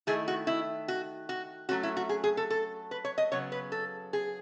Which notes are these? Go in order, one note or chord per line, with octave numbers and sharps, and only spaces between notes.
D#3 A3 E4 G#4
F#4
E4
F#4
F#4
F#3 A3 C#4 F#4
E4
F#4
G#4
G#4
A4
A4
B4
C#5
D#5
C#3 F#3 B3 C#5
B4
A4
G#4